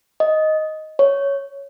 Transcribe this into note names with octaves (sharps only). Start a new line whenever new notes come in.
D#5
C#5